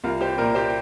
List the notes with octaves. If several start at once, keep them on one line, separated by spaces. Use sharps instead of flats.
C2 F4 A#4
G4 C5
A#2 A#3 A#4 D5
G4 C5